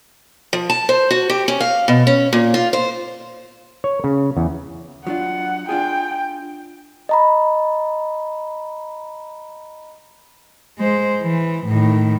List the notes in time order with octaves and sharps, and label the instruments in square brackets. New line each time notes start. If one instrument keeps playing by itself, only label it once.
[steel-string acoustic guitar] F3
A5
C5
F#4
G4
C#4
F5
B2
C#4
A#2
F4
C5
[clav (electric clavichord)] C#5
C#3
E2
[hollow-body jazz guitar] F#3 D4 F4 [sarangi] F#5
[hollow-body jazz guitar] D4 F4 G#4 [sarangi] G5
[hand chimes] D#5 A#5 B5
[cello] G#3 C5
E3
A2 D#3